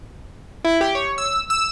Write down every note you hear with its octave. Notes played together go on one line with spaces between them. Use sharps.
E4
G4
C#5
E6
E6